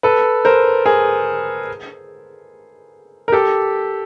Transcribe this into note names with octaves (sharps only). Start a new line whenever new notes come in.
A4 B4
A#4 C5
G#4 A#4
A#4
G4 A4